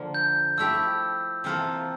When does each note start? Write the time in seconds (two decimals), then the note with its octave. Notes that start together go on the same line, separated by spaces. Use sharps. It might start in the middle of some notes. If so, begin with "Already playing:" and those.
Already playing: D3 F3 A#3
0.14 G6
0.57 F3 A3 E4 G4 E6
1.44 C3 E3 A#3 F4 A4